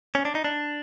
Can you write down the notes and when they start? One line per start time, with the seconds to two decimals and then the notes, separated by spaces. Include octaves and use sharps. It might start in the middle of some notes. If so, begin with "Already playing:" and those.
0.15 C#4
0.25 D4
0.35 D#4
0.44 D4